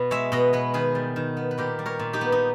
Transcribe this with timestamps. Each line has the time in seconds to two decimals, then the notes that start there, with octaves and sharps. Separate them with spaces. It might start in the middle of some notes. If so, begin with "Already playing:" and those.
Already playing: B2 B4
0.11 G#3 C#5 E5
0.32 B2 B4 D#5
0.53 B3 G#4 B4
0.74 D#3 G#4 B4
0.95 G3
1.16 D#3
1.37 B3
1.51 B4
1.58 A#2 G4 A#4
1.79 G3
1.86 A#4 C#5
1.99 A#2
2.13 D#4 G4
2.21 B3
2.32 D#4